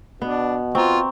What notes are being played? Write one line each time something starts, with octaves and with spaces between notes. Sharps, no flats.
B2 B3 D4
C4 F4 A#5 C6 C#6